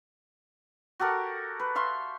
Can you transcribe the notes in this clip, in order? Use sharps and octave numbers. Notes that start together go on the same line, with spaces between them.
F#4 G4 A4 A#4
B4
E5 F5 C6 C#6